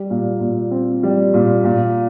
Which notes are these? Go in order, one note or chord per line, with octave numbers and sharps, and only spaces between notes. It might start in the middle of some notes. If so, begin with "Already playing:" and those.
Already playing: G3
A#2
A#2
C4
G3
A#2
A#2